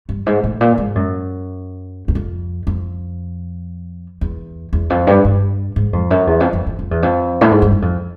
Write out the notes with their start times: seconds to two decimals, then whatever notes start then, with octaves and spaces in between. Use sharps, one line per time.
0.09 G2
0.26 G#2
0.44 A2
0.61 A#2
0.78 G#2
0.95 F#2
2.08 E2
2.15 F2
2.67 F2
4.21 E2
4.73 E2
4.90 F2
5.07 G2
5.25 G2
5.76 G#2
5.93 F2
6.10 F#2
6.27 E2
6.40 F2
6.53 F2
6.66 F2
6.79 F2
6.91 E2
7.03 F2
7.41 A2
7.51 G#2
7.62 G2
7.72 F#2
7.82 F2